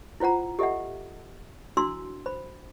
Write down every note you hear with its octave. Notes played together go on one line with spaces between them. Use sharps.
E4 F4 C5 F#5 A#5
G4 A4 D#5 E5 F#5
D4 E4 F#4 C6 E6
C5 B5